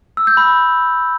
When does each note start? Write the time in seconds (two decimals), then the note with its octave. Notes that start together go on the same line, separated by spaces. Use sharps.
0.17 E6
0.27 G6
0.37 B5